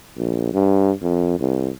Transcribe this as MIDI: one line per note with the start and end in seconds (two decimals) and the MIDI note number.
0.17 0.49 34
0.54 0.91 43
1.02 1.35 41
1.40 1.69 36